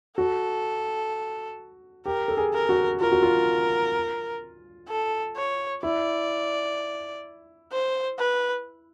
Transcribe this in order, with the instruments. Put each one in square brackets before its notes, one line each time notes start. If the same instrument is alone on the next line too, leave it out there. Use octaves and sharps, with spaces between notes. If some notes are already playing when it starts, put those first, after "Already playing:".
[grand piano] F#4 [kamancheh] A4
[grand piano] G4 [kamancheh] A#4
[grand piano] A4
G#4
[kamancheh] A#4
[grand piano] F#4
[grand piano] F4 [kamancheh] A#4
[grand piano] F#4
F4
[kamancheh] A4
C#5
[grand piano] E4 [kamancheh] D5
[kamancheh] C5
B4